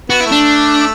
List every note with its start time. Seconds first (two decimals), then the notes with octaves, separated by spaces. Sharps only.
0.10 B3 F#4
0.21 E4
0.26 A3
0.32 D4